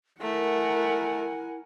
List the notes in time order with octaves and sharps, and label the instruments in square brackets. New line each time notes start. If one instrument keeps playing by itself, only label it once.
[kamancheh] A3 [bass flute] E4 [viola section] A#4 [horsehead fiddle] F#5 G#5